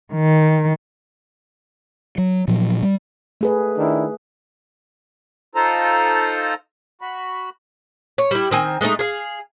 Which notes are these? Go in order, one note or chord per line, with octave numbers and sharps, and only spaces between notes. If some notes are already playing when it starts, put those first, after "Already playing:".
D#3
F#3
A#2 F3 F#3
G3
A3 G#4 B4
D#3 D4 E4
D#4 F4 A4 C5 A#5
F#4 B5
C#5
G3 E4
D#3 C4 G#5
G#3 A3 B3 D#4
G#4 F5